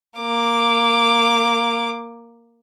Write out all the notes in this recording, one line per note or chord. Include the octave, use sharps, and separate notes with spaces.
A#3 D6